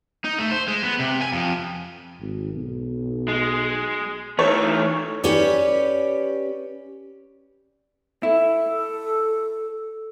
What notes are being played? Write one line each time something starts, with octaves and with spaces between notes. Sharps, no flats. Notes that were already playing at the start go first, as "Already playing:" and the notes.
D#4
A3
C5
G#3
B3
C3
G#5
F2
G#1
B1
G#3
D#3 E3 A3 C#5
C#4 G4 B4 C#5 D5
E4 A4